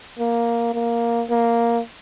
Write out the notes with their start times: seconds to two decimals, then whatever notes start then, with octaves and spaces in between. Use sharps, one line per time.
0.19 A#3
0.74 A#3
1.30 A#3